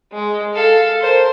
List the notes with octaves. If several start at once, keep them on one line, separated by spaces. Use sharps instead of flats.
G#3
A4 F5
A#4 C5